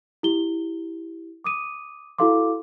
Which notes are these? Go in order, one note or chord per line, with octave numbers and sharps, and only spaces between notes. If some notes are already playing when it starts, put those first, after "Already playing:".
E4 G4 G7
D6 D#6 D#7
E4 F#4 A4 F5 C6 D6